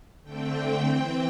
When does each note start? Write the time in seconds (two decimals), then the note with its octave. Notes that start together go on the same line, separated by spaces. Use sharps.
0.23 D3 A3 C4 G5
0.85 E3 C4